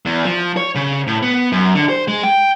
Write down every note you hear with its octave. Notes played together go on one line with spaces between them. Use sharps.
E2
F3
C#5
C#3
A2
B3
F#2
D3
C5
G#3
G5